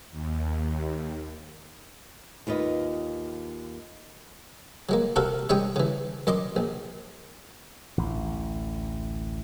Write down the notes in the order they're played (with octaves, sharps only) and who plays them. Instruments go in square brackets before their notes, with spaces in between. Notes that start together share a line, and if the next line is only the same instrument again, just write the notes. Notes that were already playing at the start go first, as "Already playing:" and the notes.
[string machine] D#2
[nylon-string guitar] D#2 F4 B4 D#5
[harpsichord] F#3 G#3 A#3
C3 F#4 A4 A#4 F5
C3 G3 G#3 C#4 G5 D#6
C#3 E3
F#2 D#5 C6 D6
A#1
[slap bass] A1 D2